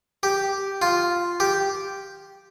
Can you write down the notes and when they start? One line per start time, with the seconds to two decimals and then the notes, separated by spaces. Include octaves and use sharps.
0.23 G4
0.82 F4
1.40 G4